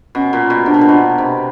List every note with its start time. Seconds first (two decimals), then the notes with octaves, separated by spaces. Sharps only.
0.15 B2 C#4
0.33 A#2
0.50 B2
0.66 C3 D4
0.74 B2
0.81 A#2
0.89 B2
1.18 C3